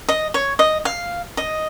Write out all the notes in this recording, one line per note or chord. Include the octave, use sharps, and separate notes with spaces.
D#5
C#5
D#5
F5
D#5